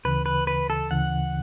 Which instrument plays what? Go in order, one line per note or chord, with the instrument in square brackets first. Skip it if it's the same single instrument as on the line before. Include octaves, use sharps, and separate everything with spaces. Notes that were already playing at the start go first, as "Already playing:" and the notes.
[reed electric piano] D2 C#3 E3 [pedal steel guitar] B4
[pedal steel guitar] B4
B4
A4
[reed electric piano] D2 C#3 E3 [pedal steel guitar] F#5